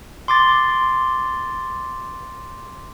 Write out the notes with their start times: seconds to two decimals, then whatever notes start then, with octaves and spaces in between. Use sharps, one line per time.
0.28 C6 D6 A6